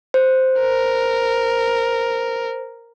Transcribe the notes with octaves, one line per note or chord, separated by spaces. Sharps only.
C5
A#4